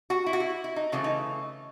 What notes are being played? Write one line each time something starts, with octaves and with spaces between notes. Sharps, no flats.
F#4
E4
F#4
E4
E4
D#4
C#3 E3 A3 F#4
D#4